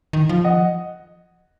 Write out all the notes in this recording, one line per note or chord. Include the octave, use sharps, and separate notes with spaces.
D#3
F3
D#5 F#5